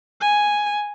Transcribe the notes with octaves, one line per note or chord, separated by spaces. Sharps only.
G#5